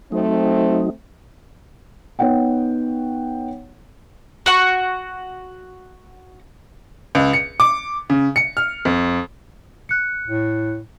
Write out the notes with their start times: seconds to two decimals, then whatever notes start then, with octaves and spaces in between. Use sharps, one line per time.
0.12 F#3 A3 C4 D#4
2.19 B3 D#4 C#5 F#5 G5
4.46 F#4 F#5 C#6
7.15 C#2
7.33 C#7
7.60 D6
8.10 C#3
8.36 C#7
8.57 F6
8.85 F2
9.89 F#6 C#7
10.27 A2